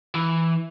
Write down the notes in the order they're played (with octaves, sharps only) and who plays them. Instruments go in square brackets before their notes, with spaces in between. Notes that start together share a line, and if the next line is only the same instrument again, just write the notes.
[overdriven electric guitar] E3